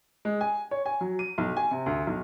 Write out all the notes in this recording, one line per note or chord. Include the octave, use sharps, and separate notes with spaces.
G#3
G#5
C#5
G#5
F#3
D#7
B1
G#5
C3
D2
B1